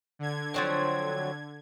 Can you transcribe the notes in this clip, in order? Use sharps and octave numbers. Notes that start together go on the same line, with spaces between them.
D3 G#6
F3 F#3 C4